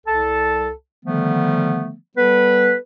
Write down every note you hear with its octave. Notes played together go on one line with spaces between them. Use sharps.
C2 A4 A5
D3 D#3 F3 G3 A3 B3
G3 B3 A4 B4